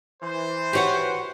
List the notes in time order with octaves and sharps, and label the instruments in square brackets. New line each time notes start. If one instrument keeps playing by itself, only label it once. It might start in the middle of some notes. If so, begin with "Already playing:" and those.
[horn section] E3 C5
[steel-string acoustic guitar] F#4 B4 F#5 [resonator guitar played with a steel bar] G4 C#5